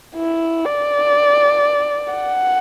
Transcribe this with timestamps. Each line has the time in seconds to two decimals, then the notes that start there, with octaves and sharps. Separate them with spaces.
0.16 E4
0.65 D5
2.13 F#5